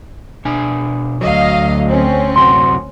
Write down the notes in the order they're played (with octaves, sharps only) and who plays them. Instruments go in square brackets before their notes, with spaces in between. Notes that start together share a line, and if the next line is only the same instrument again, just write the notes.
[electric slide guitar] B2 D4 G#5
[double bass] D2 [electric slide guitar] F#3 [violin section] D#5 F5
[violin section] C4 C#4
[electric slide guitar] F#2 C3 F#4 [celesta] C6